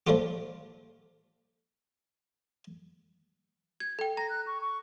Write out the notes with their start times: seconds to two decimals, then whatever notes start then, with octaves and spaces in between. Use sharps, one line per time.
0.07 F3 G3 A3 A#3 F4 G4
3.80 G#6
3.99 A4 G5
4.17 A#5 A#6
4.30 F#6
4.47 C#6
4.61 C#6